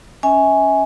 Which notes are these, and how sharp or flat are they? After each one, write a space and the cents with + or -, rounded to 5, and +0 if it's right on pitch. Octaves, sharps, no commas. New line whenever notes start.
C#4 +0 E5 -35 G#5 +0